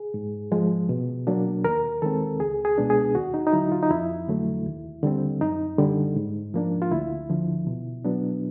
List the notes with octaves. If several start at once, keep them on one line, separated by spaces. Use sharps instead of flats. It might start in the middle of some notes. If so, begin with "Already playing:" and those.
Already playing: G#4
G#2
F3 G#3
B2
F#3 A#3 D4
D#2 A#4
D#3 G#3 C4 A4
C#2 G#4
G#4
B2 G#3 B3 D4
G#4
D#2 F#4
D#4
D#4
D3 F#3 E4
F4
D#4
F2 E4
D3 F#3 A3
D#2
D3 G3 C4
F#2 D#4
D3 G3
G#2
F3 A#3 D4
F4
D2 E4
D3 F3
B2
F#3 B3 D4